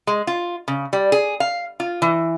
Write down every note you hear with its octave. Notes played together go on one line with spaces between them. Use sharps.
G#3
F4
C#3
G3
G#4
F5
F4
E3